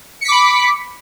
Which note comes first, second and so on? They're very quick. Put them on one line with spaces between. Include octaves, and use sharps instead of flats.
C#7 B6 D6 B5